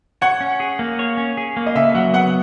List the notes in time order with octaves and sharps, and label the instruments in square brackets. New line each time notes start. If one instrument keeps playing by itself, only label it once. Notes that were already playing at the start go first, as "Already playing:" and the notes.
[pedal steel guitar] C#5 [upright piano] F#5
[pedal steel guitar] C#4
G#4
A#3
C#5
C#4
G#4
A#3
[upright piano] D#5
[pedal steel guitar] C#3 [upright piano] E5
[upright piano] E5
[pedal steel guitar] F#3 [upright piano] F#5
[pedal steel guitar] B3 [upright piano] F#5